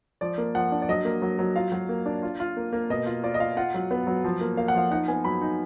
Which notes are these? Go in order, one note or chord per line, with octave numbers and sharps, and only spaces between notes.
F3 D5
A#3
F3 F#5
D4
D5
F#3 D#5
A#3
F#3
F#3
F4 F5
F#3
A#3
D4
F4
F4
A#3
A#3
B2 D#5
F4
F4 D5
D#5
F4 F5
F4 F#5
F#3
B3
F#3
F3
A#3
A#3 F5
F#5
F3 F5
D#4 F#5
B3 G#5
F#3 B5
D#4